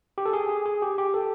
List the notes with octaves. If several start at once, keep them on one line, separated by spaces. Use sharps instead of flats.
G4
A4
G#4
G#4
G#4
G4
G4
A4